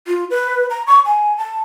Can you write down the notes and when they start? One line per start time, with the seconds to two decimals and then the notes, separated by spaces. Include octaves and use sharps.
0.07 F4
0.30 B4
0.70 A#5
0.87 C#6
1.05 G#5
1.38 A5